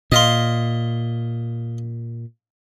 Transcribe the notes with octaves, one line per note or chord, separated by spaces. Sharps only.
A#2 D#5 F5 C6